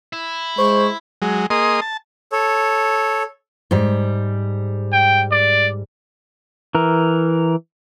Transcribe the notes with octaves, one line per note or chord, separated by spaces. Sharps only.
E4
G#3 C5 C#6
F#3 G#3
A#3 G#4 D#5 C6 D#6
A5
A4 C#5
G#2 G3
G5
D5
E3 A#4